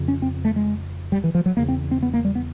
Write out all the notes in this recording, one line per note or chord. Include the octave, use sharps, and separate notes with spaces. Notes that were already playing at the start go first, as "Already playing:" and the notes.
Already playing: F2 C#3
C#4
C4
A3
G#3
G3
E3
F3
F#3
E2 C#3 A#3
C4
C4
B3
A#3
G3
B3